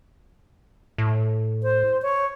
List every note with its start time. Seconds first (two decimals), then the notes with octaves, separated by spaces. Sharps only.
0.98 A2
1.63 C5
2.02 C#5